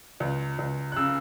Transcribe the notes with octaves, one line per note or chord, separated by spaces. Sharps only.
C#2
C#2
F#6
C#3 E6